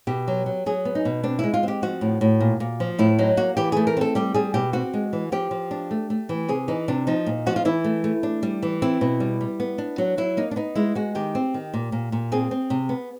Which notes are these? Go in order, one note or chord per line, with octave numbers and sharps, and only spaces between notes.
B2 G4
F#3
F#3
F#3 G#4
B3
D#4
B2
C4 D4
G#3 E4
F4
C4 G4
F3 F#4
A2
A2
A#2
A#2
F3
A2 E4
F#3 D#4
A#3 F#4
E3 G4
A3 G#4
A#4
C4 A4
G3 G4
G3 G#4
B2 G4
C4 F#4
G#3
E3
F3 G4
F3
D4
A3
A3
E3
C3 G#4
E3 D#4
C3 D4
F3 D#4
A#2
F3 F#4
F4
E3 E4
A3
A3
D4
G3
E3
C4 E4
B2
G3
G3
B3
D4
F#3 F#4
F#3 E4
A#3 D#4
D4
B3 D#4
G#3 E4
G#3 F#4
D#3 G4
C4
D#3
A#2
A#2
A#2
C4 G#4
C4
C3
B3